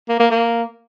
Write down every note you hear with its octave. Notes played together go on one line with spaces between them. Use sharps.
A#3
A#3
A#3